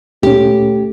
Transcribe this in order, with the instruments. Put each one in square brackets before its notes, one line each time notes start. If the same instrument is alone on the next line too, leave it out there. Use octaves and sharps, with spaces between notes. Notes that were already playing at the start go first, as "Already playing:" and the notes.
[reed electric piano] D2 A#2 C#4 [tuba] A3 [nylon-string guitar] G4